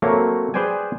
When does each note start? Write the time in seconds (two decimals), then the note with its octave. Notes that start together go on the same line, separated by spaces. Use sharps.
0.02 F#3 A3 A#3 C4 C#5
0.54 G#4 B4 C5 D5 G5 G#5